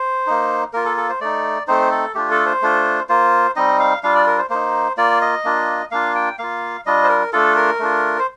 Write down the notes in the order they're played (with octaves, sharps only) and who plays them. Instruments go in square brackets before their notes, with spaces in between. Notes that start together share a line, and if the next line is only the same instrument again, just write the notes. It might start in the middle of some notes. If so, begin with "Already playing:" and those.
Already playing: [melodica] C5
A#3 D#4
A#3 F4 A#4
A4
A4
C5
A3 D#4 D5
A3 C4 D#4 C5
A4
A3 D4 F4 G4
A4
C5
A3 D4 F4
A#3 F4 C5
G3 C4 D#4 D#5
F5
G3 D4 F4 F5
D5
A#4
C5
A#3 D#4 C5
A#3 F4 D5
D#5
A#3 D4 F4
A#3 D4 F4 F5
G5
A#3 F4 F5
G3 D4 F4 D#5
C5
A#4
A3 D4 F4 A4
A#4
A3 D4 F4
C5